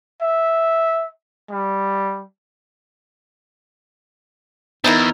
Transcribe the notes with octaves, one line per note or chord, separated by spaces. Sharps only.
E5
G3
E2 D#4 E4 A#4